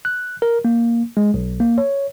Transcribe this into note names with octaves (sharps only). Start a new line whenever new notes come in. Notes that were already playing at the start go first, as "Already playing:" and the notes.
F#6
A#4
A#3
G#3
B1
A#3
C#5